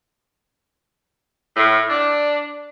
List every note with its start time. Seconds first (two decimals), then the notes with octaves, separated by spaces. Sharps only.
1.56 A2
1.89 D4